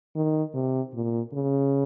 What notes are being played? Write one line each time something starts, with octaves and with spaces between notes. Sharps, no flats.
D#3
C3
A#2
C#3